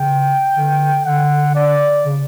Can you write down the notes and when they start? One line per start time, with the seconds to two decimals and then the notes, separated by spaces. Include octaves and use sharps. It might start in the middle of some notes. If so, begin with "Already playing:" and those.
Already playing: C#3 G5
0.56 D3
1.05 D3 F#5
1.55 D5
2.04 C#3